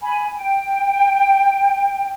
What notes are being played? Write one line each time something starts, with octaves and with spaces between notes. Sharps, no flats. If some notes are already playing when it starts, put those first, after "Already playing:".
G#5 B5
G5